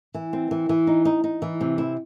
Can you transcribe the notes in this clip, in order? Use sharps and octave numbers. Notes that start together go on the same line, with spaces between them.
E3
C4
E3
E3
D#4
D#4
D#4
E3
C3
E4